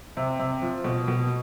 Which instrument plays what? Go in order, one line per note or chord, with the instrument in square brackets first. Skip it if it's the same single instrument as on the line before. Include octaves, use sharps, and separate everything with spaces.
[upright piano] C3
C3
F3
B2
B2